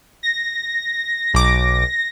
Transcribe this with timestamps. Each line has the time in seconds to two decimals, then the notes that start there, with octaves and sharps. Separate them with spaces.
0.23 A#6
1.34 B1 D6